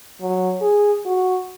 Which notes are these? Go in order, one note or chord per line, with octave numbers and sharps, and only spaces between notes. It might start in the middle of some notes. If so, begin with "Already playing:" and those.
F#3
G#4
F#4